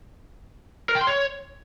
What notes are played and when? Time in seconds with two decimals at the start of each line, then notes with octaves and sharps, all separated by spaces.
0.89 A#4
0.95 G5
1.01 C6
1.07 C#5